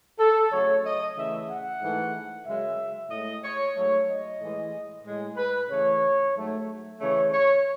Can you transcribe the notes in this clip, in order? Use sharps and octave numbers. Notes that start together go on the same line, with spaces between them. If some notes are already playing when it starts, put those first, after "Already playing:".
A4
C#3 F#3 A3 C#5
D#5
C#3 E3 A3 E5
F#5
G#2 E3 A3
F#2 C#3 G#3 E5
A2 G#3 D#5
C#5
G#2 F#3 A3 C#5
D#5
A2 E3 G#3
A2 G#3
B4
C#3 E3 A3 C#5
G#2 F#3 A3
C#3 E3 A3 C#5
C#5